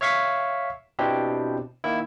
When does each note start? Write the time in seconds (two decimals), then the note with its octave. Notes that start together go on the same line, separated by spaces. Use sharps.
0.01 C#5 E5 F5 C#6 B6
0.99 B2 C4 D4 E4 G4
1.84 D#3 A#3 E4